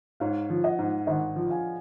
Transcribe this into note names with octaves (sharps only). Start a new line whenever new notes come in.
G#2 C#5 F5
F3
D#5 F#5
G#2
G#1 D#5 F#5
F3
F5 G#5